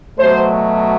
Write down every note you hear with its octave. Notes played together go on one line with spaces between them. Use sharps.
B2 F#3 A3 C5